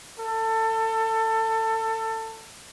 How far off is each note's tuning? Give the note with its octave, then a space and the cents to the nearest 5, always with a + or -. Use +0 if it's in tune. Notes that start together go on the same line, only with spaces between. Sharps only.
A4 +25